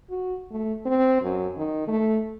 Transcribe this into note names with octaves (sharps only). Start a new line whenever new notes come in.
F#4
A3
C4
F#2
D#3
A3